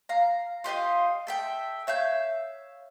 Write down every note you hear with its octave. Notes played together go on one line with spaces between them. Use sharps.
F5 A#5
F4 G4 D#5 F5
A4 E5 G5
C#5 E5 F5 G6